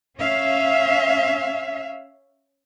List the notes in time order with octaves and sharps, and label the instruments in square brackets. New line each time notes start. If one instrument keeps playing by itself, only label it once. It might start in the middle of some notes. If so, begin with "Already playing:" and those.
[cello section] C#4 E5 F5